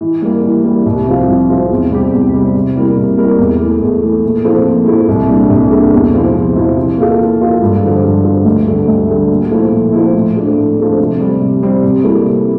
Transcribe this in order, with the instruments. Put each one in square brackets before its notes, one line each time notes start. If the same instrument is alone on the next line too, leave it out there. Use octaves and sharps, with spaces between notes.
[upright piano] E3
G3 A#3
E3
G3 A#3
C2
C3 F3 C4 F4
C2
C3 F3 C4 F4
E2
C3 G3 C4 G4
E2
C3 G3 C4 G4
C3
G3 A#3 E4 A#4
C3
G3 A#3 E4 A#4
E2
E3 A3
E2
E3 A3
A#2
F3 C4 E4 A4
A#2
F3 C4 E4 A4
C2
A#2 G3 D4 A4
C2
A#2 G3 D4 A4
E2
C3 F3 C4 E4
E2
C3 F3 C4 E4
E3
A#3 F4 A4
E3
A#3 F4 A4
G2
D3 F3
G2
D3 F3
D2
D3 G3
D2
D3 G3
A#2
F3 A3 E4
A#2
F3 A3 E4
A2
F3 A3 D4
A2
F3 A3 D4
C3
G3 C4
C3
G3 C4
C3
G3 A#3 E4 A4
C3